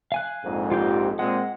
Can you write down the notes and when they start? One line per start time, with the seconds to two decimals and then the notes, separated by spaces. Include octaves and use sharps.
0.12 F5 G#5 F#6
0.43 A#1 F2 G#2
0.72 F4 G4 G6
1.19 A#2 G#3 C4 F#5